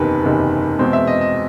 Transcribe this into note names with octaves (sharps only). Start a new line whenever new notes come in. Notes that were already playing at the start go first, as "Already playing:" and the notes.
Already playing: F#1 E2 C3 D#3 B4
F#1 E2 C3 D#3
E2 B2 G#3 C4
E5
D#5
D#5